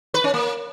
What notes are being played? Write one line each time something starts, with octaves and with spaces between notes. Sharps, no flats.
B4
C#4
A#3